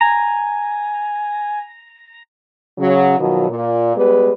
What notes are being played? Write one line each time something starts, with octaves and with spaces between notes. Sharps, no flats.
G#5 A#5
C#3 F#3
B2 D#3 F3 F#3
A#2
G3 G#3 B3 B4